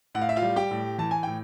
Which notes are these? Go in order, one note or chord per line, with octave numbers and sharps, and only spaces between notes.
A2 F#5
F5
E5
F4 F5
G3
G4 G5
A2
E3 A5
G#5
A2 G5